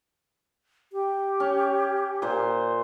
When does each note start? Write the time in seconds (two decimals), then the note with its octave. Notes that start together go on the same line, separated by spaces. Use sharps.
0.93 G4
1.40 C#4
2.22 A#2 C5